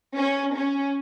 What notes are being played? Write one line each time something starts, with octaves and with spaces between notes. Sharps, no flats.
C#4
C#4